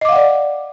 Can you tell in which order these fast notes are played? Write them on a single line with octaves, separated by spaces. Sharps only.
D#5 D6 F5 F#5 D5